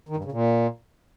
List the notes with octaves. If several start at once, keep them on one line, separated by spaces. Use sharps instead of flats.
D#3
G2
C#3
A#2